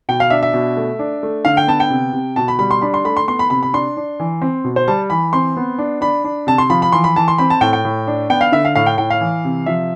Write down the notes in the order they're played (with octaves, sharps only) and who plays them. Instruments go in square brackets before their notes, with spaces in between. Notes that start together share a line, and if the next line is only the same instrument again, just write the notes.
[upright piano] B2 G5
F5
D4 E5
E5
B2
A3
D4
A3
D3 F5
G5
B3 A5
G5
C3
C3
B2 A5
B5
G3 B5
C6
D4 B5
C6
A3 B5
C6
B3 C6
B5
C3 B5
B5
D4 C6
D4
E3
C4
B2
C5
G3 A5
E3 B5
C4 C6
B3
D4
D4 B5
D4
C3 A5
C6
F3 B5
B5
E3 C6
B5
E3 A5
C6
C4 B5
A5
A2 G5
G5
A2
D4
B3 G5
F5
D3 E5
F5
A2 F5
G5
A2 G5
F5
E3
C3
F3 E5